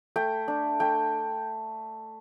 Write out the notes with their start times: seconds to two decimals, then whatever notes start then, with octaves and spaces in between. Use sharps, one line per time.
0.16 A3 G5
0.48 D4
0.80 A3 G5